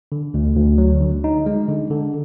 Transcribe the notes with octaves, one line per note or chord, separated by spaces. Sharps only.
D3
D2
D2
F#3
D3
D#4
G#3
D3
D3